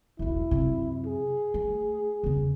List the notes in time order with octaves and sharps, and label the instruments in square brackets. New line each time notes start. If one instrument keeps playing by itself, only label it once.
[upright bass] E1 B1 [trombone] E4
[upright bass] F#2 C3
[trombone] G#4
[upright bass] A3
E2 C#3